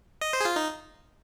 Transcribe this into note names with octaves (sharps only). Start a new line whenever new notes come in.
D#5
C5
G#4
F4
D#4